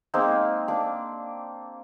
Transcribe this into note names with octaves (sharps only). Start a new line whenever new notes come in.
G#3 A#3 C4 D#4
A#3 D4